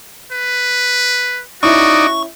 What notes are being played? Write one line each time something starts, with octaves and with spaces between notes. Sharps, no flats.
B4
C#4 D#4 E4 F#4 D5 C#6